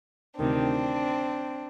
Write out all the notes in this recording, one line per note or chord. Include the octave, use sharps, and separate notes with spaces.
D2 C3 D#3 C4 D4